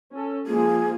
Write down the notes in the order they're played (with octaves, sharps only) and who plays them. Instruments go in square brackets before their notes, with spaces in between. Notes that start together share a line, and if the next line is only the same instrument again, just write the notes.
[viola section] C#4 A4
[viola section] F3 G#3 A#3 [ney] G#4